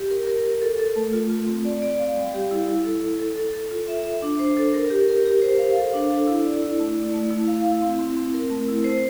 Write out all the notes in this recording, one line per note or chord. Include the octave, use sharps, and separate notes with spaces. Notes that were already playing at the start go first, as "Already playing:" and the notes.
Already playing: G4
A#4
A#4
A#4
A4
A4
A3
F4
F4
C4
D5
D5
F5
G3
G4
E4
E4
A4
A4
A4
A4
A4
F4
E5
E5
D4
C5
A4
A#4
G4
A#4
G4
C5
F5
A4
D4
A4
E4
D5
E4
A3
D5
A3
E4
F5
E4
C4
C4
C4
A#4
A3
E4
C5